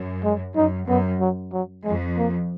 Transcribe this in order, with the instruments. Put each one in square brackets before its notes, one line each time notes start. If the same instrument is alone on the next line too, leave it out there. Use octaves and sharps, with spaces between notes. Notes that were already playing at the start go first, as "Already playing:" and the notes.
Already playing: [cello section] F#2
[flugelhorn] G#3
[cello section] F#2 [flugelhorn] D#4
[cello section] F#2 [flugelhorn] B3
[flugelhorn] F#3
F#3
[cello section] F2 [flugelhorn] G#3
[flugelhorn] A#3